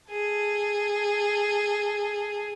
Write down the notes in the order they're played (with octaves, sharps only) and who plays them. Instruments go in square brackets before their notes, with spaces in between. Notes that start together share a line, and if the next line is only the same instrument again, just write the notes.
[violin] G#4 A4